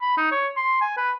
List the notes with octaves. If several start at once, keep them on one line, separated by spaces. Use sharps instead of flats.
B5
D#4
C#5
C6
G#5
B4